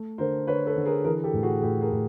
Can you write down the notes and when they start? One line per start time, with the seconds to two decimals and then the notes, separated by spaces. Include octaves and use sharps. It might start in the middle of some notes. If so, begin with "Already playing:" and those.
Already playing: A3
0.18 D3 A#4 C5
0.47 D3 B4 C#5
0.66 A4 B4
0.76 D3
0.86 G#4 A#4
1.04 E3 G#4 A#4
1.24 G4 A4
1.33 A2
1.43 F#4 G#4
1.62 A2 G4 A4
1.81 G#4 A#4
1.91 A2